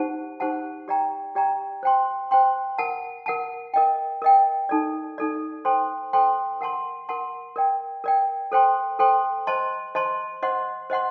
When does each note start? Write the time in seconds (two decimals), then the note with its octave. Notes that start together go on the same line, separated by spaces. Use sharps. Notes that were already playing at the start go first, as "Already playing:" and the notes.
Already playing: D#4 G4 C5 F#5 A5
0.40 D#4 G4 C5 F#5 A5
0.88 G4 D5 G5 A#5
1.35 G4 D5 G5 A#5
1.83 C5 G5 C6
2.31 C5 G5 C6
2.78 A#4 F#5 A5
3.26 A#4 F#5 A5
3.74 A#4 D#5 G5
4.22 A#4 D#5 G5
4.69 D#4 A4 D5
5.18 D#4 A4 D5
5.65 A4 C5 G5 C6
6.13 A4 C5 G5 C6
6.61 A#4 F#5 A5 C6
7.09 A#4 F#5 A5 C6
7.56 A#4 D5 G5
8.04 A#4 D5 G5
8.52 A4 C5 G5 C6
8.99 A4 C5 G5 C6
9.47 C5 D#5 A5 C6
9.95 C5 D#5 A5 C6
10.43 C5 D#5 F#5 C6
10.90 C5 D#5 F#5 C6